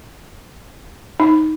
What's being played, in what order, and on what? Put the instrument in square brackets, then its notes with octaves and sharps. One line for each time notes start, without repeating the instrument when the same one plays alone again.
[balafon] D#4